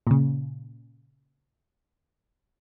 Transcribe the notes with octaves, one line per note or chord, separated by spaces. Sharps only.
A#2 C#3